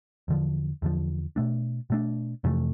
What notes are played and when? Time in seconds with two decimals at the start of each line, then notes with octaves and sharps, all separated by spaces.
0.28 E2 D3 F3
0.82 E2 D3 F3
1.36 B2 A3 D4
1.90 B2 A3 D4
2.44 F2 C3 E3 A3